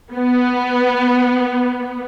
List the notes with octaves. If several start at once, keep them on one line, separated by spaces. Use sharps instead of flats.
B3